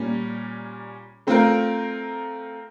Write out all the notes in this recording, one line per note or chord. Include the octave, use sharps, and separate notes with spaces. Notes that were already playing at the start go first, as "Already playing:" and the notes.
Already playing: A#2 G3 A#3 C#4
A3 C4 F4 A#4